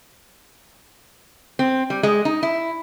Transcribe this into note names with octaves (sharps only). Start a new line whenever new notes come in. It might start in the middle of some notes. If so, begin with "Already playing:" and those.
C4
G3
G#3
D#4
E4